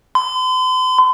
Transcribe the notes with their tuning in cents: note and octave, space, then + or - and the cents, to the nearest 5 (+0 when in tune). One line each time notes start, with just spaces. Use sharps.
C6 -45